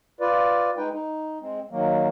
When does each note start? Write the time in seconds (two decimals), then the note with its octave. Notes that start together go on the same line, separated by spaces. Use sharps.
0.21 F4 B4 D5
0.77 G#3 D#4 B4 G5
0.93 D#4
1.41 G#3 C4
1.71 D#3 F#3 A#3